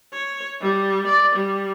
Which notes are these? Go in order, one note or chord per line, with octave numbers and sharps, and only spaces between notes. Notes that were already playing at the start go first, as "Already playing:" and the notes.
C#5
G3
D5
G3